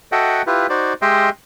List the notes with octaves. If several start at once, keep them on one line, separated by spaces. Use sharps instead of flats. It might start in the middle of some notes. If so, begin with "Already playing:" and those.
F#4 A4 D#5 E5 F#5 G5
E4 F4 G4 B4
D#4 F#4 C5 D5
G#3 G4 D#5 E5 G5 C6